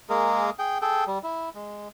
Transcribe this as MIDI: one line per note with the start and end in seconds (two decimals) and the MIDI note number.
0.10 0.50 56
0.10 0.50 58
0.10 0.50 68
0.10 0.50 70
0.59 0.78 68
0.59 0.78 79
0.82 1.04 68
0.82 1.04 69
0.82 1.04 79
1.07 1.19 55
1.23 1.49 64
1.55 1.88 56